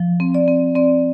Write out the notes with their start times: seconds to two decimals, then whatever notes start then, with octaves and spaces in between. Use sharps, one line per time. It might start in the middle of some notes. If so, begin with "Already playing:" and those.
Already playing: F3
0.20 C4
0.34 D5
0.48 C4
0.76 C4 D5